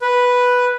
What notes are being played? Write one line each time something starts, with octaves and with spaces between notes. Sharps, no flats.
B4